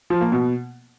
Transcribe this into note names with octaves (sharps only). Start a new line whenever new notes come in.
F3
A#3
B2